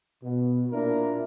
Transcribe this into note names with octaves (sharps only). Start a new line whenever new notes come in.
B2
A#2 D4 E4 A#4